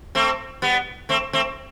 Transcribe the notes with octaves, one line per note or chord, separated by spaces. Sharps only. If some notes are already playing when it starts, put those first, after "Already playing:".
A3 C4
G3 B3
A3 C4
A3 C4